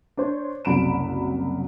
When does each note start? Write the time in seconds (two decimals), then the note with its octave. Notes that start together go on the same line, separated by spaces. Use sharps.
0.17 D4 C5 C#5
0.65 F#1 C2 F#3 B5 D7 E7